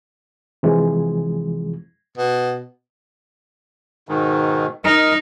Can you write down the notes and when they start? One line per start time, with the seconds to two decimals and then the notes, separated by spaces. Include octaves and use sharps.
0.63 C3 E3 F3 G#3
2.18 B2
4.09 G#2 B2 D#3
4.84 D#4 A#4 D#5